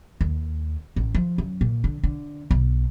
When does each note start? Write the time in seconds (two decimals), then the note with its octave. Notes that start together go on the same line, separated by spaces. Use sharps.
0.21 D#2
0.96 A1
1.14 F3
1.38 F#2
1.61 A#2
1.84 D3
2.03 D3
2.51 B1